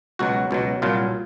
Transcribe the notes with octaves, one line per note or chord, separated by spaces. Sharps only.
C#2 B2 F#3 F#4
C#2 B2 F#3
C2 A#2 F#3 F4